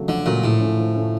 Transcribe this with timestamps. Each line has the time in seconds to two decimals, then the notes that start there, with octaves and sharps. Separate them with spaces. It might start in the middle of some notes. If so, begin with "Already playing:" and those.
Already playing: C#3 F#3 A3
0.08 F2 D3
0.25 A#2 C#3 F#3 A3
0.43 A2 F3
0.60 A3 C#4
0.77 F3
0.95 A3 C#4